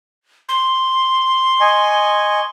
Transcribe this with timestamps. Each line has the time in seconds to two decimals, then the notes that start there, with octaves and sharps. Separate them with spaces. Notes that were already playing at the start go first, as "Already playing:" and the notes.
0.49 C6
1.60 D#5 G#5 C#6